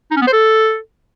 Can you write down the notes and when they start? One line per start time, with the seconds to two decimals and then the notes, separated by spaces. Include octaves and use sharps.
0.11 D#4
0.16 C#4
0.22 B3
0.27 C5
0.33 A4